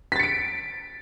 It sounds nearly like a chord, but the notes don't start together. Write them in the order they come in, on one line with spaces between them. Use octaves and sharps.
B6 A6 C#7 D7